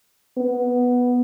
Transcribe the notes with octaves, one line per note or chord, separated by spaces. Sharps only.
B3